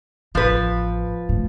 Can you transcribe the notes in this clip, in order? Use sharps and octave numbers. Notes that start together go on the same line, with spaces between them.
A1 F3 B4
A2